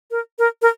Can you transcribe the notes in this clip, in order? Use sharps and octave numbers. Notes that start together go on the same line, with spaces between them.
A#4
A#4
A#4